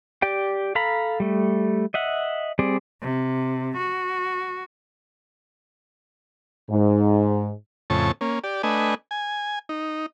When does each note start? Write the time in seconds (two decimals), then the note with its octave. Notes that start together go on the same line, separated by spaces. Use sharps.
0.22 G4 D5 G5
0.75 A4 F5 A#5 B5
1.20 G3 A3
1.94 D#5 E5 F#5
2.59 G3 C4 G#4 D5
3.02 C3
3.77 F#4
6.70 G#2
7.90 F2 A2 C#3 A5 C#6
8.21 A#3 C#4
8.44 G4 D5
8.63 A3 D4 B4 D#5 G#5
9.11 G#5
9.69 D#4